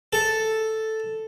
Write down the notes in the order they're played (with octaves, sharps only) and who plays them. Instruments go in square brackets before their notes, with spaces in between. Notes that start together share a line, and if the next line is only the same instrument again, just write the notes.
[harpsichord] A4